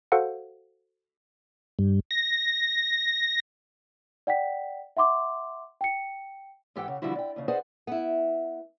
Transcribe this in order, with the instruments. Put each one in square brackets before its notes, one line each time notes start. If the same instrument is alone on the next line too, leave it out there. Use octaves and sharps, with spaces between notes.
[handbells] F#4 A4 C5 F5 F#5
[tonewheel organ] G2
A#6
[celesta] D5 F#5 G5 B6
E5 F#5 C6 D6
G5 C#7
[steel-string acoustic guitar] G#2 E3 G4 A4 F#5 G5
C#3
D3 E3 F3 G3 E4 F#4
D5 G5
D#2 C#3
G#4 B4 C5 D5 D#5 F#5
[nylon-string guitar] B3 E4